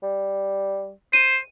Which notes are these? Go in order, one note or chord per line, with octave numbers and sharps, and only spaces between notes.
G3
C5 D#7